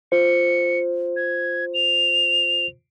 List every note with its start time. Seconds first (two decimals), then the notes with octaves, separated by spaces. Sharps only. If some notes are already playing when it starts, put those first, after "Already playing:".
0.12 F4 C5 C#7
1.16 G#6
1.74 F7